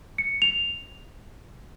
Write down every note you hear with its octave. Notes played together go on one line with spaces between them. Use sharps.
C#7
F7